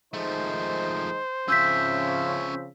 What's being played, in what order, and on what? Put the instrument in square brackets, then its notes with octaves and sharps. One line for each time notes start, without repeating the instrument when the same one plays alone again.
[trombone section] D#3 G#3 D#4 [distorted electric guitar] F3 A3 [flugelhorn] C5
[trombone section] C#3 F3 C4 [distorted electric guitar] C#4 E5 [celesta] E6 G6 B6